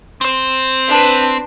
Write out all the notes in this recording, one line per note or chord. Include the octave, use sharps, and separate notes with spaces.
C4 C5
D4 B4